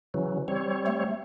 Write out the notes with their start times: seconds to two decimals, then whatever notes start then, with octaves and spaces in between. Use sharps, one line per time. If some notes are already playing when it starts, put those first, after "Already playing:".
0.14 C#3 E3 F#3
0.48 G3 C4 C#5
0.87 A3